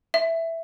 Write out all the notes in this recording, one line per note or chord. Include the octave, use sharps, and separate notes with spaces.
E5